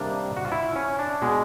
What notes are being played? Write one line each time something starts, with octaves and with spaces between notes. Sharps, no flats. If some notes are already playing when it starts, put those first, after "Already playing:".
Already playing: C3 D#3 G3 A#3 D4
F#4
F4
E4
C#4
D4
B2 G#3